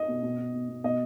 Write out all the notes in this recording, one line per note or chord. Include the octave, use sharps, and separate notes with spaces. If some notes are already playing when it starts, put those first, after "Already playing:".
Already playing: D#5
B2
B2
B2
B2
B2
B2 D#5